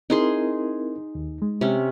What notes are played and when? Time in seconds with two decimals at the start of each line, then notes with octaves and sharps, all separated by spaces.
0.10 C4 D#4 E4 G#4 A#4 C6
1.15 D#2
1.42 G#3
1.61 C3 C#4